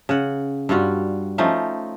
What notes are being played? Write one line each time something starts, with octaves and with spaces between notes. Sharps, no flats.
C#3 F#5
G2 G3 F4 F#4
F3 A3 C#4 D#4